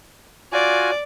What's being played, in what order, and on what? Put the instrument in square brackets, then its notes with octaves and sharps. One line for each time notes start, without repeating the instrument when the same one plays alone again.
[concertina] F4 F#4 G#5 [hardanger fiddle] D5